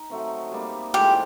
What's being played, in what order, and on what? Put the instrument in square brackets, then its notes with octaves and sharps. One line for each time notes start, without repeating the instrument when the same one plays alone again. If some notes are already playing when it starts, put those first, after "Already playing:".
Already playing: [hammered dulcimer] D#4
F#3 A3 C4
G3 A#3 D#4
[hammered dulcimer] A2 F3 G#3 [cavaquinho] G4